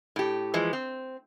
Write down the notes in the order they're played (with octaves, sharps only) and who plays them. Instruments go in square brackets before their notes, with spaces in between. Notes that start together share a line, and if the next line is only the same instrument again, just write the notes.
[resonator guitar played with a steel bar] A2 G4
E3 F3 G#3
C4